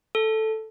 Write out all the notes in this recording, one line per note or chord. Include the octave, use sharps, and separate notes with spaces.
A4